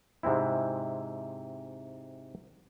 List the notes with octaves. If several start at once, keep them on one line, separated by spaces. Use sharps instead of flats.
G#2 C3 G#3 C4 E4